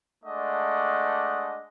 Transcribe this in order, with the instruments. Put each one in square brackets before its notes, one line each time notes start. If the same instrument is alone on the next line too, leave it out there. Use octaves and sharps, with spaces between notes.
[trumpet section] G#3 A3 D4 D5 D#5 F#5